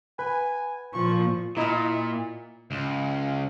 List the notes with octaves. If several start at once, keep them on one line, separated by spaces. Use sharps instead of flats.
B4 G#5
A#2 F3 C#6
A#2 E4 D#5
C#2